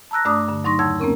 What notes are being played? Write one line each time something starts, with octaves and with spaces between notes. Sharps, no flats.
A5 A#5 E6 F#6 A#6
G2 A3 D4 D5 D6 D#6
G2 D3
F#3 D#4 C6 C#6 A#6
E2 C#3 F#5 A5 E6 G#6
A#3 C4 C#4 A#4